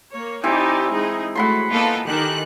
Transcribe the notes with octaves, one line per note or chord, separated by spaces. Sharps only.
A#3 C#5
E3 C4 D#4 G4 D5
G#3 D#4 G#4
G#3 A3 F#4 F#5 B5 C6
A#3 B3 D#4 F4 A4
D#3 G4 A4 A#4 F#6